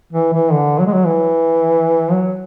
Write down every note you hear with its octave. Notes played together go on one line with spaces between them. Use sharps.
E3
E3
D3
F#3
G#3
F#3
E3
F#3